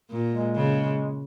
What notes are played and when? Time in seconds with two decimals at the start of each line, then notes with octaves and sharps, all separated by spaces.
0.10 A#2
0.33 G#3
0.55 C#3